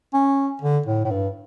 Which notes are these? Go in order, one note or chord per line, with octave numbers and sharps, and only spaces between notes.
C#4
D3
A2
A2
G2